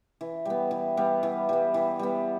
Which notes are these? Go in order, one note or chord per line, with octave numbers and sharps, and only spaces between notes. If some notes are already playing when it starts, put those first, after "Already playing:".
E3
G3 B3
E3
G3 B3
E3
G3 B3
E3
G3 B3